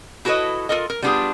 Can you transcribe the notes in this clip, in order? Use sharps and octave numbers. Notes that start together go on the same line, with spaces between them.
E4 F#4 A4 B4 C#5 D#5
F4 A4 A#4 D#5
A#4
G3 B3 D4 F4 G4 G#4